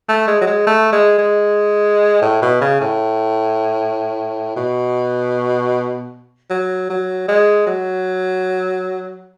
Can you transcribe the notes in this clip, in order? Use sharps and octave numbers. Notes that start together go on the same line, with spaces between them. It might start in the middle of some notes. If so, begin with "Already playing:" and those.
A3
G#3
F#3
G#3
A3
G#3
G#3
A2
B2
C#3
A2
B2
F#3
F#3
G#3
F#3